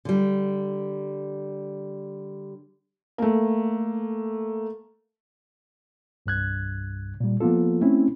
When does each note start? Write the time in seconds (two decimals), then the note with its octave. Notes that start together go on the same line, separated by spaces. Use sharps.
0.05 D3 G3
3.18 A3 A#3
6.26 C2 G2 F#6 G#6
7.20 A#2 G3
7.40 F3 A#3 B3 F4 A4
7.81 A3 C4 C#4 E4